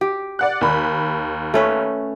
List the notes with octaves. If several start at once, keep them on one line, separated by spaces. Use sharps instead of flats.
G4
D5 F#5 F#6
D#2 B5
A3 C#4 B4